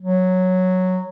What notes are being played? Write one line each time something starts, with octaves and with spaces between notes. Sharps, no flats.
F#3